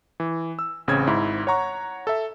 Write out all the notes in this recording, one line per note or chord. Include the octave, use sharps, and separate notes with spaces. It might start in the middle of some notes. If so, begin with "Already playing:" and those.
E3
E6
A1 C#3 C4 G#6
G#1 G#2 E4
C#5 F#5 A#5 C#6
A4 E5